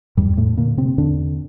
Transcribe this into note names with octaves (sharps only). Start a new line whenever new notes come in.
E2 G2 G3
A2 A3
A#2 D3 A#3
C3 C4
E2 D3 D4